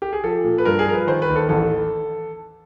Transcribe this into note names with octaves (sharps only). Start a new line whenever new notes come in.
G4
G#4
F3 A4
A#2
B4
G2 A#4
G#4
F3 A#4
B4
D#3 C5
B4
D#2
A4
A1 A4